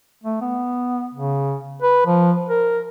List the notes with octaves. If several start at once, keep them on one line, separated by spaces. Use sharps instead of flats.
A3
B3
C#3
B4
F3
A#4